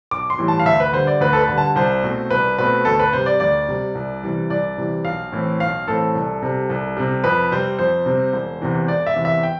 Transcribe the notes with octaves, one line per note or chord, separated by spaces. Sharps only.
B1 D6
C6
A2 E3 G3
A5
F5
D2 E5
B4
D3 G3 C5
D5
D2 B4
A4
B4
D3 G3
A5
C2 C5
B2 A3 C4
C2 B4
B2 A3 C4 B4
D2 A4
B4
C3 G3 C5
D5
D2 D5
C3 G3
C2
C3 E3 G3
C2 D5
C3 E3 G3
B1 F5
A2 E3 A3 C4
B1 F5
A2 E3 A3 C4 A4
C2
C3 G3
C2
C3 G3
F2 B4
C3 G3 C4 C5
F2 C5
C3 G3 C4
E1
E2 C3 E3
E1 D5
E5
E2 C3 E3
E5
G5